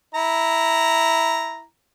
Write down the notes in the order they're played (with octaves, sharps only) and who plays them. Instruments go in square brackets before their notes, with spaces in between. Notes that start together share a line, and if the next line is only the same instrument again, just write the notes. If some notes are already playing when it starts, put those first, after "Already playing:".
[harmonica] E4 A#5